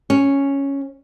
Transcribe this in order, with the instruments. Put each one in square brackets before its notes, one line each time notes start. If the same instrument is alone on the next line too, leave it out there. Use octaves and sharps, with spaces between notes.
[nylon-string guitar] C#4